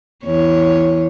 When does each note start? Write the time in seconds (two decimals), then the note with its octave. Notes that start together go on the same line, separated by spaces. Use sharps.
0.25 E2 C#5